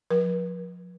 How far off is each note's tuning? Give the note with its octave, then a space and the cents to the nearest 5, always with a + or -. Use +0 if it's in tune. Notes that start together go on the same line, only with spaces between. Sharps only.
F3 +35 B4 -45